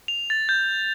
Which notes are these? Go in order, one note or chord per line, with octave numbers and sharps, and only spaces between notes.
F7
A6
G6